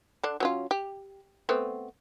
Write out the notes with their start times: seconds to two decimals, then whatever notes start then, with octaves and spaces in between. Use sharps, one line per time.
0.24 D3 D4
0.40 F#3 C#4 F4
0.71 G4
1.49 A3 B3 C4